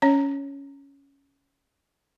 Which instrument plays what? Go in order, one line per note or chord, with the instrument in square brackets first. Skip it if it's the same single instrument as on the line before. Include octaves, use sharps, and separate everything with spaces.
[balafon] C#4 C#5